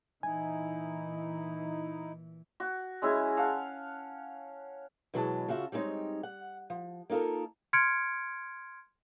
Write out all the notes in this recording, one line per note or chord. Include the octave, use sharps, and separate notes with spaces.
A#2 E3 D#4 E4 G#5
F#4
G#3 C#4 E4 G#4
F5 F#5 A5
B2 E3 F#3 G#3 D#5 A5
C#3 F4 F#4 E5
G3 G#3 C4 D#4 C#5
F#5
F3
A#3 D#4 F4 A4 A#4
C6 F6 G#6 C#7 D7